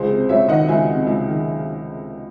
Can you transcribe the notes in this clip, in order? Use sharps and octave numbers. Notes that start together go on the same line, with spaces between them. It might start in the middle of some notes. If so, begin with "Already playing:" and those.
Already playing: C#2 G#4 C5
C3
C#2 C#5 E5
D#3 D#5 F#5
C#2 E5 G#5
C3
C#2
D#3